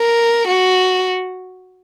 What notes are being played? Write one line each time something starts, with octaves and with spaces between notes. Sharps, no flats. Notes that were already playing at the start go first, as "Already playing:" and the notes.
Already playing: A#4
F#4